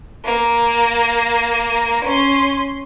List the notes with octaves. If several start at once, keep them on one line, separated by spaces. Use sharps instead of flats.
A#3
C#4 C6